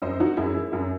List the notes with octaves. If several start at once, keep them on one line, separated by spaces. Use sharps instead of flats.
F#2 C5 D#5
E3 D#4 F#4
F#2 E4 G#4
E3
F#2 E4